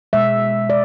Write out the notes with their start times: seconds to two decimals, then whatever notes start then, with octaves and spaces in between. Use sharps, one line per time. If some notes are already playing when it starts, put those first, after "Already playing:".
0.13 B2 G#3 E5
0.70 D5